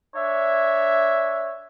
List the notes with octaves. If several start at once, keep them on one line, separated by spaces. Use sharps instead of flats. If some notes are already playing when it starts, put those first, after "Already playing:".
D4 C#5 E5